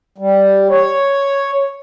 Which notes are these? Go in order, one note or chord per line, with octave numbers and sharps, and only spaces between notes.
G3
C#5